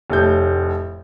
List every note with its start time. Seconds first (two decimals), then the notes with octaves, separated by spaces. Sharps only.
0.10 F1 A2 G6